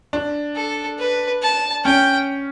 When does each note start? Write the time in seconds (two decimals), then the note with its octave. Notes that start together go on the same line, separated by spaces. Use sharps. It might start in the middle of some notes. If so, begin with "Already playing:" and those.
0.13 D4
0.56 A4
0.99 B4
1.42 A5
1.85 C#4 G5